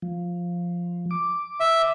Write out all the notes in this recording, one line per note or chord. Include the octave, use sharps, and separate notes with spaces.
F3
D6
E5